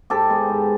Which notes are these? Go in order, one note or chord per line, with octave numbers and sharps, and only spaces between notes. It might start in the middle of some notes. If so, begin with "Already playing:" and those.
G#2 G4 A4
D#3 G#3 B3
G#2